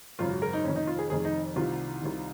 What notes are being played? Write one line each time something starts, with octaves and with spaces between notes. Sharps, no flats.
G#1 F#2 C#3 F4
F#4
A#4
D#4
F1 F2 D#3 C#4
D#4
F4
G#4
F1 F2 D#3 G#4
D#4
C2 C3 D#3 F4
C2 C3 D#3